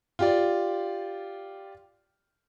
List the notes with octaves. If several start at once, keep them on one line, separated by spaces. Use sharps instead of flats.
F4 G4 D5